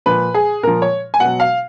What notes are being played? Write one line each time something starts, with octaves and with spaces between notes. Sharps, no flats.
A#2 F3 B4
G#4
A#2 F3 A#4
C#5
G#5
B2 F#3 F#5
F5